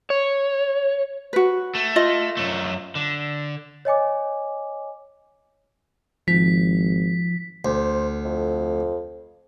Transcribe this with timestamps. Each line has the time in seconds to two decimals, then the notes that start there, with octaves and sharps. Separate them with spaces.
0.10 C#5
1.33 F#4 B4
1.75 A3
1.96 F4 D#5
2.37 F#2 A3
2.95 D3
3.85 C#5 D#5 G#5 D6
6.28 G#1 F3 B6
7.65 D2 C5
8.25 F2